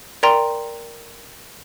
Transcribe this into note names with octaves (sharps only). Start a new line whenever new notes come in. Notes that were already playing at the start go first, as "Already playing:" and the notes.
A#4 D5 G5 A#5 C6